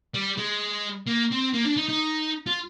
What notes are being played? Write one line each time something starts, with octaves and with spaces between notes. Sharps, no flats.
G3
G#3
A#3
C4
A#3
D4
D#4
D#4
F4